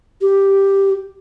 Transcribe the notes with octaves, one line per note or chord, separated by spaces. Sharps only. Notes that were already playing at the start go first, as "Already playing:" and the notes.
G4